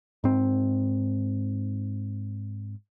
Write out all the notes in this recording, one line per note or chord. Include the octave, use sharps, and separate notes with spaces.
G#2 C4